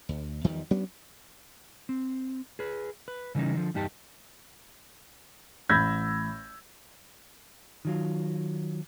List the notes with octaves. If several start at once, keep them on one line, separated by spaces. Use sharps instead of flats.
D2
E2 D#3 F3 G3
F#3 B3 C#4 D4
C4
G#4 B4
B4
C#3 E3 G3 C#4 D#4
D3 F3
E2 G2 D#4 G4 A5
A1 B5 E6 G6 G#6 A#6
D#3 F#3 F4